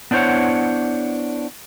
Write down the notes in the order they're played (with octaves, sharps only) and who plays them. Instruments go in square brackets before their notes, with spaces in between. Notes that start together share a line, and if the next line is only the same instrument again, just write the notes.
[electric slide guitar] B3 D4 E4 C5 C#5 F#5